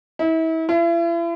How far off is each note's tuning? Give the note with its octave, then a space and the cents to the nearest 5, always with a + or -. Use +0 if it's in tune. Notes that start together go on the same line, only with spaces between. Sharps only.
E4 -35
E4 +40